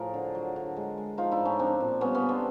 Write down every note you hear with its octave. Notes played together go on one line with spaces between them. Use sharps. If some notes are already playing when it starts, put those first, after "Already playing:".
Already playing: A2 F3 G#4 A#4
D3
F#3
D3
G#3
G#3
F3 D#4 F4
D4 E4
A2
C#4 D#4
F3 C4 D4
A#2
G3 B3 C#4
B3 C#4
D3
C4 D4